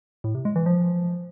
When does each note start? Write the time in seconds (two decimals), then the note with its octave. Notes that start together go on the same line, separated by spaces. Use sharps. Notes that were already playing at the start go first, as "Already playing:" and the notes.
0.24 A2
0.35 C3
0.45 G#3
0.56 E3
0.66 F3